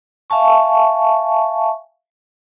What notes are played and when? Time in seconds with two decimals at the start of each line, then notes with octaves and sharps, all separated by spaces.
0.30 E5 F5 G#5 A5 C#6